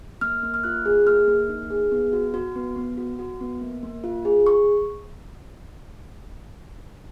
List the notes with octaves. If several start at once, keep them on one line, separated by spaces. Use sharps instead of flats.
A#3 F6
A#3
F6
F4 F#6
G#4
A#3 F6
A#3
D#4
G#4
B3
F#4
F#4
B3
B3
F#4
F#4
B3
A#3
A#3
F4
G#4
C#6